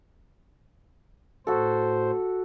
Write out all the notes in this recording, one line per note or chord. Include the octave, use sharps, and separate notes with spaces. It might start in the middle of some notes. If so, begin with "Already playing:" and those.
A2 F#4 A4 C5